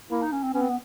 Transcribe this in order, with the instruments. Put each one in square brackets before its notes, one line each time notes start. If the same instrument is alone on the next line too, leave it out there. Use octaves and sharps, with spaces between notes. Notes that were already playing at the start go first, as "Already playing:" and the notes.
[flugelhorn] A#3 [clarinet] E4
[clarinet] D#4
C#4
C4
[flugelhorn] B3 [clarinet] C#4
[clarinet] C4
B3